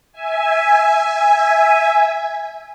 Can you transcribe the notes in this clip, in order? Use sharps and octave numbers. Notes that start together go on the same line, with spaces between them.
E5 G#5